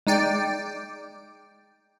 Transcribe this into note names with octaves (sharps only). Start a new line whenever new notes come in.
G#3 D#4 D5 G5